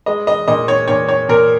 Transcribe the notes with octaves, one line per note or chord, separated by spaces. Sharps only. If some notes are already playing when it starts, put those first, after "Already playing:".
G#3 D#5
D#5
A#2 D#5
C#5
A#2 C#5
C#5
A#2 A#4